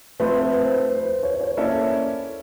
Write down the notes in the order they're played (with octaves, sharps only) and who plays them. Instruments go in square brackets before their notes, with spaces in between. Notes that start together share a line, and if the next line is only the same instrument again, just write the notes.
[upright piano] F3 A3 C4 [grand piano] B4
[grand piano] B4
C5
B4
C5
C#5
C#5
[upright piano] A#3 C#4 E4 A4 C#5 [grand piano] D5